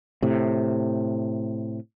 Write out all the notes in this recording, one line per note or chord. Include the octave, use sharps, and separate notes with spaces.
A2 C3